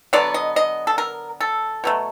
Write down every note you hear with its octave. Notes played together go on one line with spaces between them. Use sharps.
D3 F#3 B3 D5
D#5
D#5
A4
A#4
A4
B2 F#3 A3